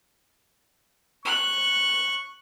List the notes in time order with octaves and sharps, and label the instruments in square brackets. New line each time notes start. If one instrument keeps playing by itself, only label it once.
[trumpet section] C#6 [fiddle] F#6